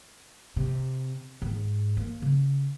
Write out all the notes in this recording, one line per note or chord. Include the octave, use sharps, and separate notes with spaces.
C3
G#2
A#3
C#3